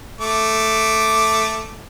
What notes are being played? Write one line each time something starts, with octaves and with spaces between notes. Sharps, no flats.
A3 D6